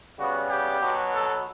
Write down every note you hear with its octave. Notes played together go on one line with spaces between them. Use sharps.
C#3 G3 B3 F#4
G4
B2 F#3 B3
A4